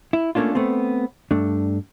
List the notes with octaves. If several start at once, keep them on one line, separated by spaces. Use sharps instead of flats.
E4
A3 A#3 C#4 D4 F4
A3 B3 C4
G2 A3 D4